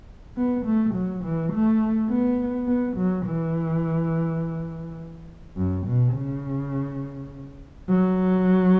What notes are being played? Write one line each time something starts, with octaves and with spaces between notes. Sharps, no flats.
B3
A3
F#3
E3
A3
B3
B3
F#3
E3
F#2
B2
C#3
F#3